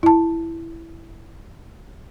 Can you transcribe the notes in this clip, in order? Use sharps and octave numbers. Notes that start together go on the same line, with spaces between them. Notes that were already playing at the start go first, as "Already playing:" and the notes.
E4 A5